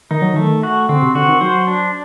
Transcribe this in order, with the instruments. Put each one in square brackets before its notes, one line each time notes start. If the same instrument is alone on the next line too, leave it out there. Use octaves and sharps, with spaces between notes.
[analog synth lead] D#3 [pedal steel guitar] D#4
[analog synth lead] F#3
[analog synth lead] D#3 [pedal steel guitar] A3
[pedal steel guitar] F#4
[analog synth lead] D3 [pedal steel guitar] C4
[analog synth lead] C3
[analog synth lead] D3 [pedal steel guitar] F#4
[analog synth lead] D#3
[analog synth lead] F#3 [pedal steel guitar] C5
[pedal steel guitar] D4